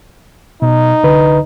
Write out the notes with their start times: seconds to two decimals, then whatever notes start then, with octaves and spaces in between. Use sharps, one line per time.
0.62 B2 D#4
1.03 C2 D3 B4